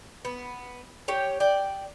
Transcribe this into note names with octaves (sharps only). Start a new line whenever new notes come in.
B3
G4 C#5
D5 G5